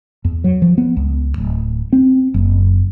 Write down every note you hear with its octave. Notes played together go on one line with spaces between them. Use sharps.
E2
F#3
F3
B3
C#2
D1
C4
F#1